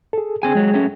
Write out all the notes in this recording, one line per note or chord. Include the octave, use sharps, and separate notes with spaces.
G#4 A4
D3 C4 G#4 G5 G#5 G#6
F#3 G#3
F#3 A3 C#4